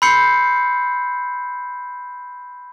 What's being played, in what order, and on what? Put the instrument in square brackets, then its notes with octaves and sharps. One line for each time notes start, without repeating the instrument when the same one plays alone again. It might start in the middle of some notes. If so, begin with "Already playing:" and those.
[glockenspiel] B5 C6 E6 G6 C7 C#7